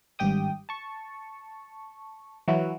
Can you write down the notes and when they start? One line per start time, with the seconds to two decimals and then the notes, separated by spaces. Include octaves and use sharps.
0.19 G#1 G2 G4 G5 D#6
0.69 A5 C#6
2.48 E3 F#3 E4 F#4